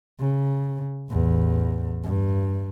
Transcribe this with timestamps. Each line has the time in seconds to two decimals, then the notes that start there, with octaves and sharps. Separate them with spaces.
0.19 C#3
1.10 A1 E2
2.04 G2